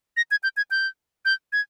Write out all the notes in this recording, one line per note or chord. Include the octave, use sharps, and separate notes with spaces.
A#6
G#6
G6
G#6
G6
G6
G#6